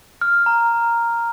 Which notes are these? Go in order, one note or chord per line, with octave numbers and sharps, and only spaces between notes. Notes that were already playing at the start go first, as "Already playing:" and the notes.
F6
A#5